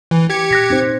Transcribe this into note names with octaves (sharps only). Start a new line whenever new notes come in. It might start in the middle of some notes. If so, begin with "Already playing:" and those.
E3
G4 G#6 C#7
A#2 F#6 A#6 B6
C4 D#4 C5